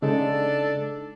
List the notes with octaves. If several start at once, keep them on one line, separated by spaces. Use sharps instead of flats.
C#3 G#3 D4 D#4 A4